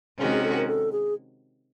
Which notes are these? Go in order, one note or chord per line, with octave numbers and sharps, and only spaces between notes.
C3 D#3 G#3 C#4 F#4 G#4
G#4
A4
A#4
A4
G#4